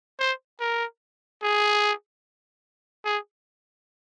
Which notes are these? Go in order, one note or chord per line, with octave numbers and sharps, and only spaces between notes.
C5
A#4
G#4
G#4